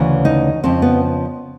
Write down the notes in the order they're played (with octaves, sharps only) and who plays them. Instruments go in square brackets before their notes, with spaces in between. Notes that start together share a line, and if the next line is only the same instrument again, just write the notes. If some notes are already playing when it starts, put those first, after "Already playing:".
Already playing: [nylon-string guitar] D2 C#3 E3
D#4
F2 C#3 F3 C4
B3